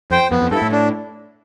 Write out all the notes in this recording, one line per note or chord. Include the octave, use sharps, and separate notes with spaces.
F2 C5 G5
F2 B3
F2
G2 E4 A4
A2
D4